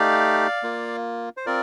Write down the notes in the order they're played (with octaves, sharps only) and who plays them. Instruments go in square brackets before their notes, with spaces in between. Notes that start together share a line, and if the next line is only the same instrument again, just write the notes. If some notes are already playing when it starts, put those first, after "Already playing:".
Already playing: [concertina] A3 D#4 G4 D5 F5
A#3 F4
C5
C4 F4 A#4 D5